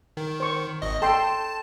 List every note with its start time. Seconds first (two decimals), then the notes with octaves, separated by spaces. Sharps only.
0.17 D#3
0.40 C5 C#6
0.82 G#1 D#5
1.02 A4 G5 A5 C6